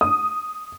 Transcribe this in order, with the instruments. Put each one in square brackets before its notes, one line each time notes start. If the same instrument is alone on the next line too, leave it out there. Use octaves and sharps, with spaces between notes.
[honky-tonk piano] D#6